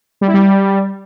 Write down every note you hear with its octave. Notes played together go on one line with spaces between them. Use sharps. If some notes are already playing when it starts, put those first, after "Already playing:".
G3
E4
G3